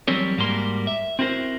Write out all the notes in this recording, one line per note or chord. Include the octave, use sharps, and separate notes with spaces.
E3 F#3 G3 C4 A#4 C#5
G#2 G3 A#3 F#4 A#4 C6
E5
C4 E4 F#4 A#4 C5